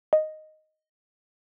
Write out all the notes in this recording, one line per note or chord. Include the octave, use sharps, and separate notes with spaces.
D#5